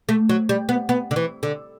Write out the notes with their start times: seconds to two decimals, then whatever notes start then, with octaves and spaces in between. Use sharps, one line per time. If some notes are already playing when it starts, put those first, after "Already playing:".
0.09 A3
0.29 F#3
0.49 G3
0.69 B3
0.89 B3
1.11 D3
1.16 E3
1.43 D3